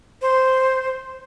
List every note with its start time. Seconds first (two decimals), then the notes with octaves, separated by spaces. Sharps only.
0.22 C5